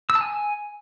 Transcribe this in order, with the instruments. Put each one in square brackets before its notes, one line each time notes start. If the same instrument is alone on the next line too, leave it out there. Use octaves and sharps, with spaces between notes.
[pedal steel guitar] E6
A5
G#5